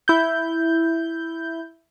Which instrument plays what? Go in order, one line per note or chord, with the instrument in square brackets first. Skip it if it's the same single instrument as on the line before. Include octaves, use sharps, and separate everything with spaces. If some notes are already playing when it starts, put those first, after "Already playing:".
[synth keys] E4 G6